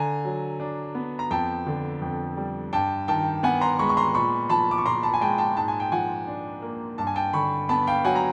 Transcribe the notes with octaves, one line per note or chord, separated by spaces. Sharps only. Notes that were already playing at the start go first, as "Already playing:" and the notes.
Already playing: D3 G#5 A#5
F#3
D4
B3
A#5
F2 G5 A5
D3
F2
G3
G2 G5 A5
D#3 G5 A5
B3 F#5 G#5
A#5 C6
G#3 B5 C#6
C#6
A#5 C6
A#2 B5 C#6
F3 A5 B5
D6
C#6
A#2 A#5 C6
A5 B5
G#5
G#3 G5 A5
G5 A5
G#2 A5
G#5
G5
F3 F#5 G#5
D4
A#3
G2 A5
G#5
G5 A5
D3 B5 C#6
B3 A5 B5
F5 G5
F#3 F#5 G#5
A#5